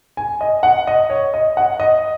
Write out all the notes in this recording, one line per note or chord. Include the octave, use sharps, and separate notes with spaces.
G#5
D#5
F#5
D#5
C#5
D#5
F#5
D#5